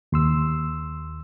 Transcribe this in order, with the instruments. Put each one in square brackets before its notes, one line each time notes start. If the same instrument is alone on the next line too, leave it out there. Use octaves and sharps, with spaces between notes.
[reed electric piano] D#2 C6 E6